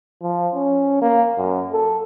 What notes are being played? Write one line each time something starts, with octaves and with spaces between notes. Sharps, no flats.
F3
C#4
A#3
F#2
A4